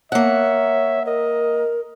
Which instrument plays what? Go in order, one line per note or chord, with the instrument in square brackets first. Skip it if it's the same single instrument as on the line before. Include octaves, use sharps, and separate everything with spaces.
[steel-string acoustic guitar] A#3 F#5 [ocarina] C#5 [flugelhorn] E5
[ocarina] A#4 [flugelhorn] D#5